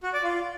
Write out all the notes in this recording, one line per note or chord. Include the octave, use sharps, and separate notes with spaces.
F#4
D5
F4